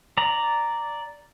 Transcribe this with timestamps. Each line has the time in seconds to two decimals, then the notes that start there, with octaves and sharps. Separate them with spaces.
0.17 D5 A#5